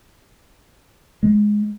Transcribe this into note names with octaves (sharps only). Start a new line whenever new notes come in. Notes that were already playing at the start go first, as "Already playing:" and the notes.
G#3